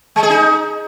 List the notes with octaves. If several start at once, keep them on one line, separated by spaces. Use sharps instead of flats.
G#3
G#4
D#4